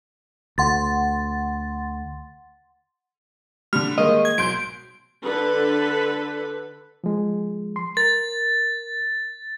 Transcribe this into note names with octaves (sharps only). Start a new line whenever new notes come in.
D2 F#5 C6 A6
D3 G3 F6
D#3 G#3 A#3 D#5
G#6
B1 C6 G6 D7
D3 A4 B4
F3 G#3
C6
A#4 A6